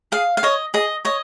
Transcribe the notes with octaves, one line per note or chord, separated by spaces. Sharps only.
G#4 F5
F5
C#5 D#5
G#4 D#5
C#5 D#5